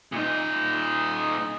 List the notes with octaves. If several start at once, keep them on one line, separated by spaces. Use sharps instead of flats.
A#2 D#4